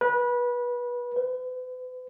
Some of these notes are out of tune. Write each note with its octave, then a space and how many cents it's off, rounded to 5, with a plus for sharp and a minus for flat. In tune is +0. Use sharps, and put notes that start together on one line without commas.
B4 -25
B4 +40